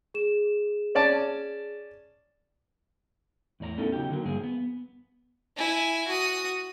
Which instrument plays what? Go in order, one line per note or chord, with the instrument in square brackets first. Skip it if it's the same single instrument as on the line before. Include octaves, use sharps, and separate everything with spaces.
[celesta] G#4 E7
[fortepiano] C#4 D5 A5
[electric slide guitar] E2 A2 D5 A#5
A3 B3 C#4 D#4 E4 A4
C#3 F#3 D#4 G4
D3 F#3 A#3
G2 F3 G#4
B3
[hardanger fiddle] E4 G#5
F#4 D#6